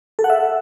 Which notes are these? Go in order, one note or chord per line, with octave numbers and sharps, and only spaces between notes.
A4
F#5
E5